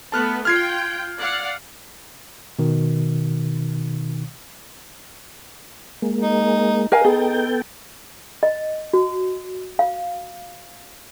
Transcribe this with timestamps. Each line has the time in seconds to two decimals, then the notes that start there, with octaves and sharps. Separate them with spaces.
0.12 A3 B3 A5 F6 F#6
0.45 F4 G5 F6 G#6 C7
1.19 D5 F5 F#5
2.59 B2 D#3
6.02 G#3 A#3
6.22 D#4
6.92 D#4 A#4 F5 G#5
7.04 B3 G#4 A4 G5
8.43 D#5
8.93 F#4
9.79 F5